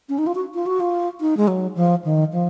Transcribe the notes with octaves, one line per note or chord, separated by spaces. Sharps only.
C#4
D#4
F4
F#4
F4
F#4
F4
D#4
G#3
F#3
F3
D#3
F3